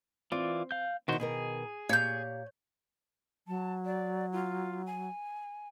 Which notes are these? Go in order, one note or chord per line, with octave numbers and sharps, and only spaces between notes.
E3 C4 F4 D5
F5 G6
B2 D#3 E4 F#4 C5
B2 D#3 G#4 A#4
A#2 G4 C#5 F5 G6
F#3 A5
D5
F4
G#5